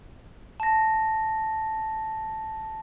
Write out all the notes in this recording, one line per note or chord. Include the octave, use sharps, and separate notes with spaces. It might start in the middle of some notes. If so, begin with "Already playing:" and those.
A5 A#6